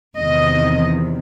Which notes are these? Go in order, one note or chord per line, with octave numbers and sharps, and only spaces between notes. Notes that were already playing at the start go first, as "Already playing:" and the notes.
E2 C3 D#3 D#5